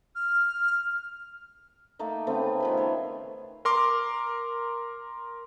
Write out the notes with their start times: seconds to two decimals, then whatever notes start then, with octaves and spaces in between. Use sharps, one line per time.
0.15 F6
1.99 A3 A#3 D#4
2.27 C#3 A3 B3 C4
2.60 D#3 F3 B4
2.77 C#5 E5 C6
3.65 A#4 C6 D6